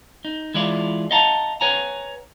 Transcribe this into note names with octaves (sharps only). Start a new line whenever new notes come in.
D#4
E3 G#3 E4 F4 D5
D#5 F5 F#5 A5 A#5
B4 C#5 F#5 G#5 A#5